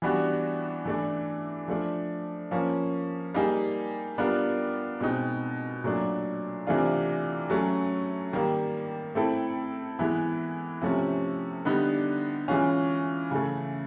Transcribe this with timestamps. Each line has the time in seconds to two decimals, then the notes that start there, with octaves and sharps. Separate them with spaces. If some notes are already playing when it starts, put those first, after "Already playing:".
0.02 E3 G3 B3 D4 F#4
0.85 E3 A3 D4
1.68 F3 A3 D4
2.51 F3 A#3 C#4
3.34 G3 A#3 D#4 G#4
4.18 G3 B3 D4 F4 A#4
5.01 B2 G#3 C4 D#4
5.84 A#2 F#3 A3 D4
6.67 C3 E3 A3 D4 F4
7.50 F#3 A3 C#4
8.33 D#3 G3 A#3
9.15 A3 C4 E4 A4
9.99 E3 G#3 B3 E4
10.82 C3 F3 A3 C#4
11.65 D3 G3 B3 D#4
12.48 E3 G#3 C#4 F4
13.31 C#3 E3 A3